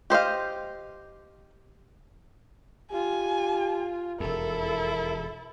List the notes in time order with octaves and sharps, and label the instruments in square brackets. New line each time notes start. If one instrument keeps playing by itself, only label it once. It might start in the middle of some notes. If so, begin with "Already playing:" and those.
[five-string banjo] G4 C5 D#5 F5
[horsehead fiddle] F4 [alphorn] G4 [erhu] G#5
[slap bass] E1 F2 [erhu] E4 [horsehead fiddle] A4 [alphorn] A#4